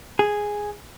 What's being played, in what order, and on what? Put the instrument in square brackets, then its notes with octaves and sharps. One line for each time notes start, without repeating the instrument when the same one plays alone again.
[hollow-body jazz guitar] G#4